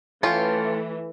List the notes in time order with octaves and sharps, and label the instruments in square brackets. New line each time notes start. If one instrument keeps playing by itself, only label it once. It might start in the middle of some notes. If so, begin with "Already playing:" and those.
[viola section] E3 A3 [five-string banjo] C#4 F4 [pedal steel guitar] A4 G5